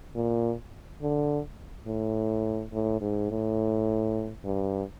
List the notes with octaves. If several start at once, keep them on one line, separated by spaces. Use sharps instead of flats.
A#2
D3
A2
A2
G#2
A2
G2